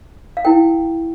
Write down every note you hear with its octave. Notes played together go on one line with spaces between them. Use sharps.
F5
E4 A#4 G5